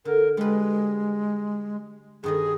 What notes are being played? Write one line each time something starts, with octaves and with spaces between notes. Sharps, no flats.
D3 A#4
G3 G#3 B4
G2 D#3 G#4 D#5